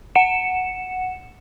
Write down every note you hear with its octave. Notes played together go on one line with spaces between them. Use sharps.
F#5 C#7 E7